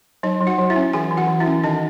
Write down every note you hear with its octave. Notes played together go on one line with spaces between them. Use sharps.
F#3 D#4 D#5
F#3
F#4 F#5
F#3
E4 E5
C#4
E3 G#4 G#5
E3
F#4 F#5
E3
E4 E5
C#4
D#3 D#4 D#5